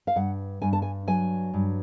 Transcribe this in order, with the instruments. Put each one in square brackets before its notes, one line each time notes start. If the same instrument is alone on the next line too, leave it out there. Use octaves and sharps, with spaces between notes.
[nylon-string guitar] F5
G2 F#5
G2 G#5
A5
G#5
F#3 G#5
G2